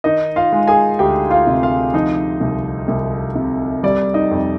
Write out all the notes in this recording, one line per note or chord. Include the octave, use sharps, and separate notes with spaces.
D#3 D#4 D#5
F4 F5
G#3
G#4 G#5
D2 G4 G5
F4 F5
C3
F4 F5
F3 D#4 D#5
C2
C2
C3
G3 D5
D#4 D#5
F2